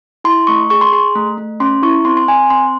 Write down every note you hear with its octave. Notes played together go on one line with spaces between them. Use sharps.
E4 C6
A3 C#6
G#4 C#6
C6
G#4 C6
A3
A3
C#4 C6
E4 C#6
C4 C6
C6
C4 G#5
C4 C6